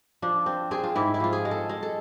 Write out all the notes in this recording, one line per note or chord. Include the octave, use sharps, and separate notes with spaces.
F3 D4
C4
C4 G#4
F4
G#2 E4
E4
F3 F4
G#4
G#3
A4
G#3
A4